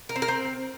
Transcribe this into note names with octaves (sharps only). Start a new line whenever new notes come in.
A#4
C4
A#4
C4